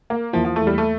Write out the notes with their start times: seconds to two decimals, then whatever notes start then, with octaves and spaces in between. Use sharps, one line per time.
0.10 A#3
0.33 E2 E3 F3 A#3 E4
0.45 F3
0.56 A3
0.67 G3
0.78 A3